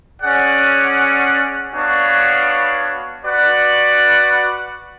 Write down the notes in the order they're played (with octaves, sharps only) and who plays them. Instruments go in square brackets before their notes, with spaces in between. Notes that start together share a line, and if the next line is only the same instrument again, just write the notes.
[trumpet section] C#4 G#4 D5 F#5
B3 D4 F#4 C#5 F5
F#4 B4 D5 F#5